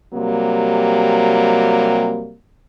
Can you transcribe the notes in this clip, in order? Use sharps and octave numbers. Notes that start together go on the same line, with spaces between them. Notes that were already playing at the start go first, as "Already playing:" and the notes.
C3 F#3 G3 A#3